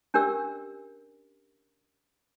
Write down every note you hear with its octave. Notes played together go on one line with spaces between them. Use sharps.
C#4 D4 G4 A#4 D5 E6